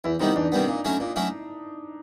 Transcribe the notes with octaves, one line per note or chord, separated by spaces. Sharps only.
E2 E4
C3 D#3 G3 B3 D#4
E2 D4
C3 D#3 G3 B3
A#2
F#3 A3 C#4 E4
A#2
F#3 A3 C#4 E4